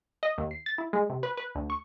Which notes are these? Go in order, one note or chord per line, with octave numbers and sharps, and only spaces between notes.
D#5
D#2
C7
A6
E4
G#3
C3
B4
B4
D2
C#6